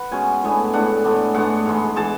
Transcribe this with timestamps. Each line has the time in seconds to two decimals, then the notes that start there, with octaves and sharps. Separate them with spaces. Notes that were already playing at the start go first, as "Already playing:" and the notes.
Already playing: B4 F#5
0.11 B2 G#3 C#4 G#5
0.43 A2 G#3 B3 D4
0.73 A2 G#3 B3 D4 F#5
1.04 A2 G#3 B3 D4
1.34 A2 G#3 B3 D4 F#5
1.66 G#2 E3 G#3
1.96 E3 G#3 A5